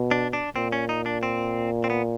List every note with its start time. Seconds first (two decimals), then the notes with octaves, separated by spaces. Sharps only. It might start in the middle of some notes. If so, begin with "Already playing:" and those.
Already playing: B2
0.11 D4
0.33 D4
0.56 A#2 C4
0.72 C#4
0.89 D#4
1.06 D4
1.23 C4
1.84 C4
1.90 B3